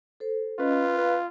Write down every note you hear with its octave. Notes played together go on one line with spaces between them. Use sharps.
A4 C5
C#4 F4 B4 D#5
B4 F5